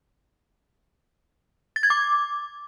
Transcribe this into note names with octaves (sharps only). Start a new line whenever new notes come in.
A6
G#6
D6